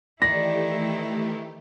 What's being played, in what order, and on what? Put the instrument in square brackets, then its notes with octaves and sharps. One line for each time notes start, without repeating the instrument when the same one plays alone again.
[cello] D#3 E4 [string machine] E3 A3 G4 [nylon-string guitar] D5 [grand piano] A#6